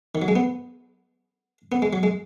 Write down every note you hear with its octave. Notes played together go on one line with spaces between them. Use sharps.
D#3
F#3
G#3
B3
B3
G#3
F#3
G#3